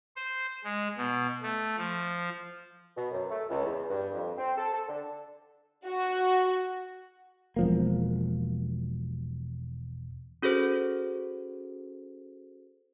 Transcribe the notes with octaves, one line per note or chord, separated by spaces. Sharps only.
C5
G#3
B2
A3
F3
B2
F#2
A3
C#2
E2
G2
F2
C4
A4
A4
D3
F#4
E1 F3 A#3
C#4 F#4 G#4 A4 C5